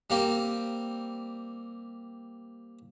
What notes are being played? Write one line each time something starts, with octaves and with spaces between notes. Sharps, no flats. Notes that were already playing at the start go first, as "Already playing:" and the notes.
G3 A#3 C4